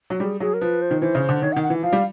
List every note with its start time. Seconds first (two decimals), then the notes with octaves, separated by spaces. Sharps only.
0.10 F#3
0.20 G3 G#4
0.40 F#3 G#4
0.54 A#4
0.61 F3 B4
0.82 C5
0.91 D#3
1.02 E3 C5
1.15 C#3
1.29 D3
1.42 D#3 C#5
1.53 F#5
1.56 D#3
1.63 F#5
1.70 E3
1.83 F3 F5
1.93 G3